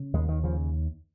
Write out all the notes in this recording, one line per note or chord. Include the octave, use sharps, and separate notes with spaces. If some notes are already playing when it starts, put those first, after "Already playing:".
Already playing: C#3
D#2 G#3
D#3
C#3 F3